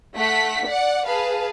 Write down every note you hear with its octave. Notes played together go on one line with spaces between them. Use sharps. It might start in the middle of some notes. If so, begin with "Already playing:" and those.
A3 F#5 B6
D5 F#5
G#4 B4 F5 A5